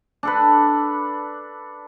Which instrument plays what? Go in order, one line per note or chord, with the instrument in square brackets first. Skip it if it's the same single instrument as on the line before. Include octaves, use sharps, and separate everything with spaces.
[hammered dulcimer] D4 A4 B4